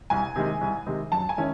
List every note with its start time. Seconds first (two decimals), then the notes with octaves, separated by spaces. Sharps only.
0.10 C2 G#5
0.36 C3 D#3 G#3
0.61 C2
0.87 C3 D#3 G#3
1.12 F#2 A5
1.29 G#5
1.38 D#3 G#3 C#4 E4